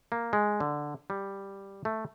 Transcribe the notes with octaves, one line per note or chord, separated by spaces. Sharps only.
A#3
G#3
D3
G3
A3